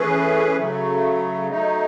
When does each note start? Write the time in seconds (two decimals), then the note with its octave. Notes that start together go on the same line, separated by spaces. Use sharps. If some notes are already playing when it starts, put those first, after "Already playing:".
Already playing: E3 A3 C#4 G#4 B4
0.56 C#3 F#3 A3
1.50 F#3 A3 D#4